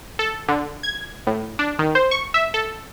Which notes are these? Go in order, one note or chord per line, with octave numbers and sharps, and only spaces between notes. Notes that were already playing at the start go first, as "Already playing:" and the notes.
A4
D3
G#6
A2
D4
D#3
C5
C#6
E5
A4